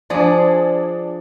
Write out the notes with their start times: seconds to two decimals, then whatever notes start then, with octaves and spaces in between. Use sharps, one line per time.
0.10 F3 D4 G#4 D5